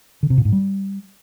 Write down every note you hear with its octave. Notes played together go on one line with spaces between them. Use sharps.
D3
C3
A#2
G#2
G3